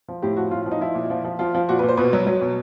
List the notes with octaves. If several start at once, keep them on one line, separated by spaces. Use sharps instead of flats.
F3
A2 G4
F3 F#4
A2 F4
F4
F3
D#4
F3 E4
A#2
F3
F3
F3 F4
F3
A#2 F#4
B4
A#2
C5
B2 B4
F#3
F#3
B2